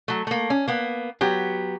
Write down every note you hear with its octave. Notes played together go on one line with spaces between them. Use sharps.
F#3 A3
A3 A#3
C#4
A#3 B3
F#3 B3 G4